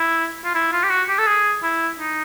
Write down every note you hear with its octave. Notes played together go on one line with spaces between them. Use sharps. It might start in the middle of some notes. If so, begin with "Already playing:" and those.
Already playing: E4
F4
E4
F4
G4
F#4
G4
A4
G#4
E4
D#4